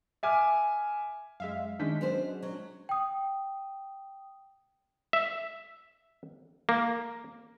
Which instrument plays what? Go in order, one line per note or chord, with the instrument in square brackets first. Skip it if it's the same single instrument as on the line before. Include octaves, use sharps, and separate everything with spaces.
[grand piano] E5 G#5 D6 F6
[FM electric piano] F#2 [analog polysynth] G#3 E5 F5
[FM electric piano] D#3 G6 B6 [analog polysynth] G#3 C#4 D4
[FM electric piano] F#3 [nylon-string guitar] B3 C4 C5
[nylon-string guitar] F#3
[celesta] G5 D#6
[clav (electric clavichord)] E5
A#3